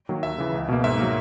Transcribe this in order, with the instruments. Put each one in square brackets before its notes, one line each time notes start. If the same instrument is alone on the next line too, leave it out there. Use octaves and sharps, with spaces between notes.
[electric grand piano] D#3 F#3 A#3
D#2 E5
C#3 E3
C#2
B2 A#3
G#2 E5
F#3 A#3